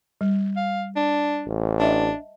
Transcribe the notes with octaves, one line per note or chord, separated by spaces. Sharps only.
G3
F5
D4
A1
D4 D#5 E5 A5